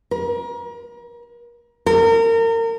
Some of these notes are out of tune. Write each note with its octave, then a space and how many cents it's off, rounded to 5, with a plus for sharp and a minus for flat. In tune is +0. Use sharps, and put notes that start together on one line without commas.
A#4 +35
A#4 -30